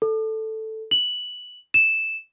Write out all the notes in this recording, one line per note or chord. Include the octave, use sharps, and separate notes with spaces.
A4
F#7
E7